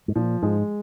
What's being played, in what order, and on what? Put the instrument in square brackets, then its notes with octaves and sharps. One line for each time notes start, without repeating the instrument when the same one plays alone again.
[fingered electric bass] G#2
[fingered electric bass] A#2 [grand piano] F3
[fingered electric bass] G#2 [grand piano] G#3